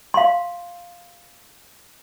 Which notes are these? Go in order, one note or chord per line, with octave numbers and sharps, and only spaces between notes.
F5 C6